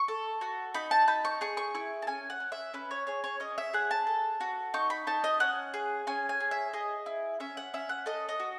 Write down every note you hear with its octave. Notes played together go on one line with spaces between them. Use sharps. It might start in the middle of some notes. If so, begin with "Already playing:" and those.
Already playing: C#6
A4
F#4
D#4 B5
A5
D#4 B5
C#6
G#4 C#6
C#6
E4 C#6
A5
C#4 G#5
F#5
C#4
E5
C#4 B4
C#5
G#4 C#5
C#5
C#4 D#5
E5
G#4 F#5
A5
A4
F#4
D#4 C#6
B5
D#4 A5
D#5
C#4 F#5
G#4
C#4 G#5
G#5
G#4
E5
G#4 D#5
E4
C#4 E5
F#5
C#4 E5
F#5
A4 D#5
D#5
F#4